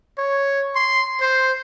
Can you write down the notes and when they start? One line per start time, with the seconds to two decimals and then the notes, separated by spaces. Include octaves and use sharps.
0.18 C#5
0.75 C6
1.21 C5